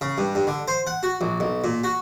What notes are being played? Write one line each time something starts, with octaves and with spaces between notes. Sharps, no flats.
C#3
G2
G2
D3
C5
F#5
F#4
A#1
B1
A#2
F#4